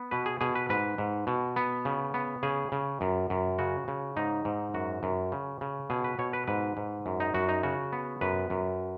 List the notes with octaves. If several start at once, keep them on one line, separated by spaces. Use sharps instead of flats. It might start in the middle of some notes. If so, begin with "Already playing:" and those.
Already playing: B3
B2 B4
G#4
B2 G#4
B4
G#2 B4
G#2
B2
B3
C#3
B3
C#3 G#4
C#3
F#2
F#2
C#3 F#4
C#3
G#2 D#4
G#2
F#2 F#4
F#2
C#3
C#3
B2 G#4
B4
B2 C#5
B4
G#2 B4
G#2
F#2
D#4
F#2 F#4
D#4
C#3 F#4
B3
F#2 B4
F#2